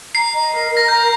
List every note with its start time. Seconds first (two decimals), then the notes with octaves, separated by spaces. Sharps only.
0.14 A#5 C7
0.33 D#5
0.51 A#4
0.70 A#4
0.77 A#6
0.88 A#5 G6